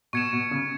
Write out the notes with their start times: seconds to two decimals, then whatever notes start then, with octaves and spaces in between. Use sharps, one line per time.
0.13 B2 C#6 G#6 C#7 E7
0.33 B2
0.51 C#3